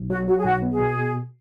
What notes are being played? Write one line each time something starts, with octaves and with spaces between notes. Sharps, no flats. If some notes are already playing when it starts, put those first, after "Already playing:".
Already playing: B1
F#3 F#4
F#3 F#4
G#4
B1 F#4
B3
G#4
B2